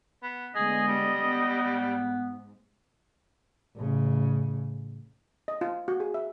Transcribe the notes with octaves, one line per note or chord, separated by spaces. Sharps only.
B3
D3 G#3 B3 G#4 D#5
G3
B3
G#2
A1 C#3
D#5
F4
F#4
G#4
E5